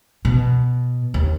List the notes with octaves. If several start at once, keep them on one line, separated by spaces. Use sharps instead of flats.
B2
D#2